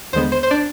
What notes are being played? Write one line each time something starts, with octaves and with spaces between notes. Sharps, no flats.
D#2 D3 G#3 B3 C5
C5
C5
D4 D5